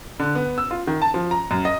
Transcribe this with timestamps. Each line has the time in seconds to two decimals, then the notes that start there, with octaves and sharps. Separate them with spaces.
0.20 D3
0.35 B3
0.58 E6
0.71 F4
0.87 D#3
1.02 A5
1.14 F3
1.31 A#5
1.51 F#2
1.65 D#5